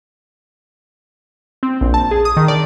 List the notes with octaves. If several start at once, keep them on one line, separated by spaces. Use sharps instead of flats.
C4
A#1
A5
G#4
D#6
D#3
D5